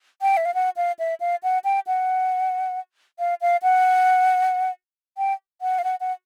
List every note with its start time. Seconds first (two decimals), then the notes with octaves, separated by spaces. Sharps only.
0.22 G5
0.37 E5
0.45 F5
0.54 F#5
0.77 F5
0.99 E5
1.20 F5
1.43 F#5
1.64 G5
1.87 F#5
3.19 F5
3.41 F5
3.63 F#5
5.18 G5
5.61 F#5
5.79 F5
5.84 F#5
6.00 F#5